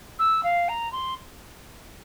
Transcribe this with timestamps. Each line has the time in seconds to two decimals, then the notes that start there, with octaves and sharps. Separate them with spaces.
0.18 E6
0.43 F5
0.68 A#5
0.92 C6